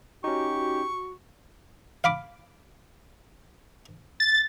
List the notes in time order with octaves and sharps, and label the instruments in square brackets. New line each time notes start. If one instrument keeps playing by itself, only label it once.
[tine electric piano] C#4 D#4 [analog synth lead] F#4 [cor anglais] G4 [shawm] C#6
[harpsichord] F5 B5 D6
[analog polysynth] A6